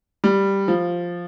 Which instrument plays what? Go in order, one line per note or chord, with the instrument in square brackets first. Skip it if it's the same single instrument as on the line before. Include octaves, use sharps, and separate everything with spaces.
[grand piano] G3
F3